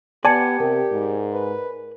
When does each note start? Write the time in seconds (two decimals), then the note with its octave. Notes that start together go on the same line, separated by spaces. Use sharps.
0.25 B3 G4 D5 G#5 A5 G#6 C#7
0.60 C3 A#4
0.91 G#2
1.33 B4